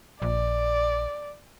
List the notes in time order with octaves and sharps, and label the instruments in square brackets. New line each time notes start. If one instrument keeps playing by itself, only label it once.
[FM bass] A#1 [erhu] D5